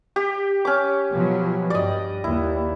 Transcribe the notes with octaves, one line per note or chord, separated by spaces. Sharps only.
G4
C#4 D6
B2 F3 F#3
G2 D5 D#5
D#2 E4